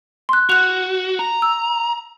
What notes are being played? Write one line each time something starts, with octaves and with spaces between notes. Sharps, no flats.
C6 F#6
F#4 F#6 F7
A#5
E6